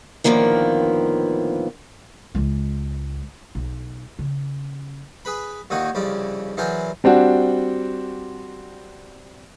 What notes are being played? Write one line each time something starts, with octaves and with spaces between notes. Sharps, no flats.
A2 D3 D#3 F3 A#3 B3
C#2 G#3
B1
C#3
G#4 B4 B5
D#2 A#2 D#3 D#4 F#4 D#6
C2 F2 C#3 D5
E3 F#3 G#4 A#4 C5 D5
G3 C4 D4 F#4